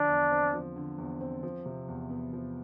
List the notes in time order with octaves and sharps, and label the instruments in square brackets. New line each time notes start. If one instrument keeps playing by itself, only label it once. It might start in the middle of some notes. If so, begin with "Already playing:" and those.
Already playing: [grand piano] D3 F3 [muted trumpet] D4
[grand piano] E2
C4
F3
D3
E2
C4
F3
C3
E2
B3
F3